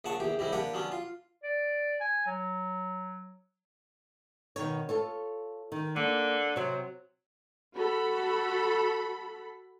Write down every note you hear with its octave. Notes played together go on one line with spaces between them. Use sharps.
A#1 C#3 F#5 A5 C#6
A#1 E2 G4
C2 G#2 G3 E4
A#3 D4 G4 B4 F#5
F#3 B3 C#4 D4
F4
D5
G#5
F#3
B2 D#3 C#5
F4 A4 C#5
D#3
D3 A#3
C3 F#3 C5
F#4 A4 B5